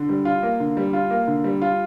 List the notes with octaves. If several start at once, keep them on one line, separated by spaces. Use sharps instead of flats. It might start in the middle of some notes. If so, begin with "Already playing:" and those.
Already playing: D3
G3
F4
A#3
D3
G3
F4
A#3
D3
G3
F4